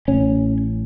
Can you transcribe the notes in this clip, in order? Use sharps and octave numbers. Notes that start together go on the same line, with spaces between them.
A1 A2 C#4